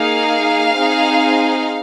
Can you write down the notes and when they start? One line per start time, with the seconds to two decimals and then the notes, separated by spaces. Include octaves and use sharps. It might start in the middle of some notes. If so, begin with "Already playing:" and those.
Already playing: A#3 D#4 G#4 F5
0.75 C4 D#4 G#4